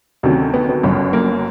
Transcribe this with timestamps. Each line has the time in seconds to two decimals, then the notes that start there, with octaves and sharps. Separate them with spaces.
0.23 D2 C3 D#3 F#3 C#4
0.54 B3
0.69 B3
0.83 G1 F#2 C#3
1.13 A#3